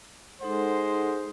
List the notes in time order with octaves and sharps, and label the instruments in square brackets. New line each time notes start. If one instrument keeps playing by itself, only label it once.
[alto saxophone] G#3 [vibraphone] D#4 A4 F#5 [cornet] C5